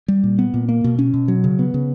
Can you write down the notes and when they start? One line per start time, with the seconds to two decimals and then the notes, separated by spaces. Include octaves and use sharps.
0.08 G3
0.24 A#2
0.39 B3
0.54 A#2
0.69 A#3
0.84 B2
0.99 C#4
1.14 B2
1.28 F#3
1.44 C#3
1.59 B3
1.74 C#3